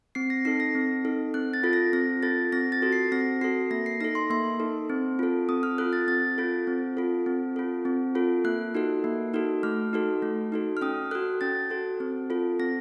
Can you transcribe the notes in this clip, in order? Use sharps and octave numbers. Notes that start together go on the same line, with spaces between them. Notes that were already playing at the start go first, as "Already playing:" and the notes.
C4 C7
A#6
D#4 A4 C7
A#6
C4
D#4 A4
C4 F#6
A6
F4 A4
A#6
C4 A#6
F4 A4 A6
C4 A#6
A6
F#4 A4
C7
C4 A#6
F#4 A4 C7
A#3 A#6
C7
D#4 A4 A#6
C6
A#3 C6
D#4 A4
C4
F4 A4
C4 D#6
F6
F4 A4 F#6
A6
C4 A6
F4 A4
C4
F4 A4
C4
F4 A4
C4
F4 A4
A#3 F#6
D#4 F#4 A4
A#3
D#4 F#4 A4
A3 F6
D#4 F#4 A4
A3
D#4 F#4 A4
F6
C#4 D#6
F#4 A4 F#6
C#4 A6
F#4 A4
C4
F4 A4
C4 A#6